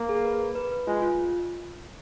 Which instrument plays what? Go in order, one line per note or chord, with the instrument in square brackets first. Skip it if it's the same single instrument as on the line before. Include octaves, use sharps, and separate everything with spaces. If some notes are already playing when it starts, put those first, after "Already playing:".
Already playing: [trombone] A#3
[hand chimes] G#4
B4
B4
B4
B4
[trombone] G#3 [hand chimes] F4
[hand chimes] F4